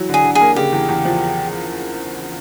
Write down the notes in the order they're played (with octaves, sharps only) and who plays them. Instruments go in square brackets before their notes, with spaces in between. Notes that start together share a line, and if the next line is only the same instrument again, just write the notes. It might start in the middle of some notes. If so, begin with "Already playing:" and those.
Already playing: [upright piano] E3 F#3
[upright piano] D3 [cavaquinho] G#4
[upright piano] D3
[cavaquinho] G#4
[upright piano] A#3
[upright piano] C#3 [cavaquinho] G4
[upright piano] E2
E2
F3